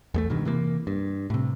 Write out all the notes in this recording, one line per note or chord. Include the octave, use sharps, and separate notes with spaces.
E2 G#3 A3
G2 B2 D#3
C3 E3 G3 A#3
G2
A2 C3